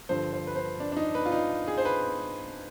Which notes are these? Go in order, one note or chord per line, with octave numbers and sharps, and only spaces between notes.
G2 D3 F3 C5
C5
B4
C5
D4
D4
D#4
B4
F4
D#4
G#4
C5
B4